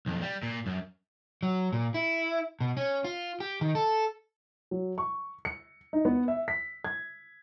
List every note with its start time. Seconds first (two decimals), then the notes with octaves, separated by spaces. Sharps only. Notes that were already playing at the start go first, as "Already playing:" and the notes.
0.06 B1 F2
0.22 G3
0.43 A#2
0.66 F#2
1.43 F#3
1.73 A#2
1.94 E4
2.61 B2
2.77 C#4
3.04 F4
3.40 G4
3.61 D#3
3.75 A4
4.71 F#3
4.98 C#6
5.45 C#7
5.93 D#4
6.05 B3
6.28 E5
6.48 B6
6.84 G#6